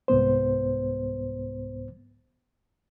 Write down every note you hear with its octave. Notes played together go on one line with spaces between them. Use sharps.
C2 G#2 B3 C5